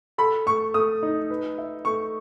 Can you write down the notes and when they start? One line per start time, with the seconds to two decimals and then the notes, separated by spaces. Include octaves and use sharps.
0.18 A4 B5
0.46 A3 C#6
0.74 A3 D#6
1.03 D#4
1.30 B4
1.58 E5
1.85 A3 C#6